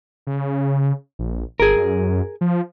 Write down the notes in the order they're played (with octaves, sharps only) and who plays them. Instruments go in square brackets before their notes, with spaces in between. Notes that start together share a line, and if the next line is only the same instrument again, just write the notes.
[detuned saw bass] C#3
A#1
[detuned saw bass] G1 [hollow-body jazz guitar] G#4 A#4
[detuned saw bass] F#2
F3